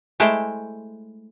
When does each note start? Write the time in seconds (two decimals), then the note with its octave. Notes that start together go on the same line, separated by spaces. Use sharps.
0.20 G#3 A3 E4 C5 G5